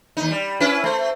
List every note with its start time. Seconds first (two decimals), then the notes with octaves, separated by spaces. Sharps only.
0.17 D#2 D#4
0.31 G3
0.60 C#4 E4 B4
0.84 A3 C5